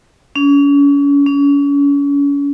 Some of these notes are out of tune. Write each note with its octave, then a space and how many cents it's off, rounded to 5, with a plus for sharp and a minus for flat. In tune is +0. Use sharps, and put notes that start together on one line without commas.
C#4 +35
C#4 +35